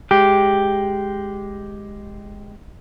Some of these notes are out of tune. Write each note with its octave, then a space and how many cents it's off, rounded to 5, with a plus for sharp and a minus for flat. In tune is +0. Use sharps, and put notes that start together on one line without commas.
G#3 +0 G4 +0